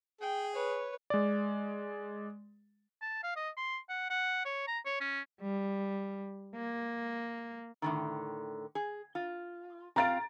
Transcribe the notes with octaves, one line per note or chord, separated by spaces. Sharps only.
G#4 G5
B4 C#5
G#3 D5
A5
F5
D#5
C6
F#5
F#5
C#5
A#5
C#5
C#4
G3
A#3
A2 D3 D#3
G#4
F4
C4 F4 F5 A#5 A6 D7